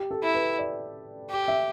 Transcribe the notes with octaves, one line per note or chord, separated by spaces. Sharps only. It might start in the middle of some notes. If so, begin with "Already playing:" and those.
Already playing: G4
A4
E4
B4
D5
G4
E5